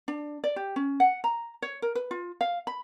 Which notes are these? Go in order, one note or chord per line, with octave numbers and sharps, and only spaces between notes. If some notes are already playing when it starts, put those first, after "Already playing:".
D4
D5
G4
C#4
F#5
A#5
C#5
A#4
B4
F4
F5
B5